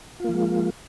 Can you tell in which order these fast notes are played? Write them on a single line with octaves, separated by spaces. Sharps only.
F4 A#3 F3 G#3